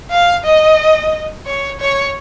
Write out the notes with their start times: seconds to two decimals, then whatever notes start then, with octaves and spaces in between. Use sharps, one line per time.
0.11 F5
0.45 D#5
1.46 C#5
1.80 C#5